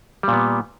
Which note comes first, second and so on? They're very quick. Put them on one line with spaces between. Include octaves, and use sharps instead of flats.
G3 A#2 B3